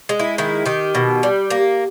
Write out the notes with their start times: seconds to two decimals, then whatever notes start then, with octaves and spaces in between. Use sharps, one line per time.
0.09 G#3
0.20 E4
0.38 D#3 E4
0.66 D#3 G4
0.95 B2
1.23 G3
1.50 A#3